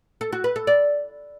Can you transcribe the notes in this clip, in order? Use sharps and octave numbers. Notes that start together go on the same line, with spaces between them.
A4
F#4
B4
A4
D5